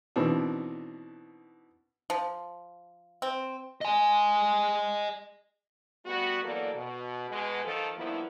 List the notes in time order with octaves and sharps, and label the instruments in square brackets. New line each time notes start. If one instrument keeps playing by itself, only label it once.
[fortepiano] B2 D#3 E3 C4 D4
[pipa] F3
C4
[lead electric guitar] D#5 G#5
[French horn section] G3 A3 B3 F#4
E2 F#3 A#3 B3 A4 D5
B2
B2 G#3
D#3 F3 A4
G2 D#3 F3 A#3 B3 E4